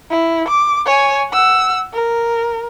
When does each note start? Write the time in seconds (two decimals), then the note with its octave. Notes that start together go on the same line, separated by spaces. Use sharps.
0.10 E4
0.48 D6
0.86 C#5 G#5
1.31 F#5 E6
1.94 A#4